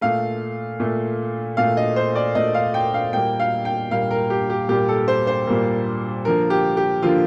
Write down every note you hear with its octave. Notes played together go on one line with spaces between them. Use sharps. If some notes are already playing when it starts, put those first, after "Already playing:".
A#2 A3 F5
A#2 A3
A#2 A3 F5
D#5
C5
D5
A#2 A3 D#5
F5
G5
F5
A#2 G3 A#3 G5
F5
G5
A#2 G3 A#3 F5
A#4
G4
G4
A#2 G3 A#3 G4
A4
C5
C5
A#2 G3 A#3
D3 F3 A#3 A#4
G4
G4
D3 F3 A#3 F4